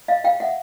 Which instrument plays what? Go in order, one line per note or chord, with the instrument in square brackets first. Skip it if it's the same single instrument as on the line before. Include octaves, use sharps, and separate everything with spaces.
[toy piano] D#5 F5
F5 G5
E5 F#5